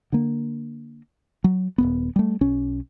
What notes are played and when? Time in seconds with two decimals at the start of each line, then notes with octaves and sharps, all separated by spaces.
0.12 D3 A#3
1.44 F#3
1.78 D#1 E2 B3
2.16 G3 A3
2.41 B1 C#4